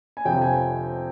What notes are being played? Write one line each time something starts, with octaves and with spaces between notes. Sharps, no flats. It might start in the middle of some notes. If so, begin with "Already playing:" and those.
G#5
F2 C3 F3 G5
G#5